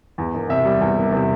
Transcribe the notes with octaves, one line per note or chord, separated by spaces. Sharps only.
E2
E1
C3 E5
G3
E2
E1
C3